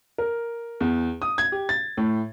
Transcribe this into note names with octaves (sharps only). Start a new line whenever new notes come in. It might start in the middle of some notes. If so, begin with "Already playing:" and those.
A#4
E2
D#6
G#6
G4
A6
A2